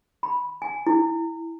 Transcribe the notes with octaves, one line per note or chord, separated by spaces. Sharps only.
B5
G#5
E4